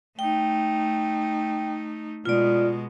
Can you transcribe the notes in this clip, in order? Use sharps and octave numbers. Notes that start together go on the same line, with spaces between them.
A3 D#4 G5
B2 G#3 F4 D5